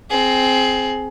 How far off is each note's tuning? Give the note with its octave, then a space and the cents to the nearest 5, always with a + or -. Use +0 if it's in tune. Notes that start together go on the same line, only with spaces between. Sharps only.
C4 +0 G#4 +20